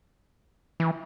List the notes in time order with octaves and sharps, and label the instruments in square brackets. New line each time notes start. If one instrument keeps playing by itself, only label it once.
[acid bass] E3